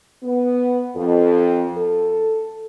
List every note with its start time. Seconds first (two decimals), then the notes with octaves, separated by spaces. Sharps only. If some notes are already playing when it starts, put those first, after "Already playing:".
0.23 B3
0.96 F2
1.76 A4